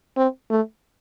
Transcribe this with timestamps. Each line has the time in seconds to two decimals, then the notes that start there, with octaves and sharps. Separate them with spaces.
0.16 C4
0.50 A3